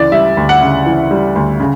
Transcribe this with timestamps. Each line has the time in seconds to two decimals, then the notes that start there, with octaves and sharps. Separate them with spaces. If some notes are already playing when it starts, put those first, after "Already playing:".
Already playing: D2 C#3 E3 D5
0.12 G3 E5
0.37 D2
0.49 F#5
0.61 C#3
0.86 E3
1.11 G3
1.35 D2
1.60 C#3